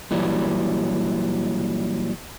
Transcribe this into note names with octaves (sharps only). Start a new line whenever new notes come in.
A#2 E3 F#3 G3